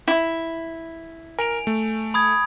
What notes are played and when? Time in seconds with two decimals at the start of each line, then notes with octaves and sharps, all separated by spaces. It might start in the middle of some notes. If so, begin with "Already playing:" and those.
0.08 E4
1.39 A#4 G#5 D7 F7
1.67 A3
2.14 B5 D#6 G#6